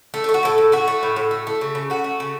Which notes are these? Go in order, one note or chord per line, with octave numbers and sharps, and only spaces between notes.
A3
A4
A3
F#4
A2 A4
A2
A3 F#4
A3
A2
A2
A3
A3
C#3
C#3
A3 F#4
A3
C#3